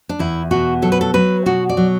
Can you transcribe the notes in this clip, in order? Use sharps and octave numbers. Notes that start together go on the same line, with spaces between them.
D4
E2 E4
B2 F#4
F#3 A4
B4
A4
F#3 B4
B2 F#4
D5
F#3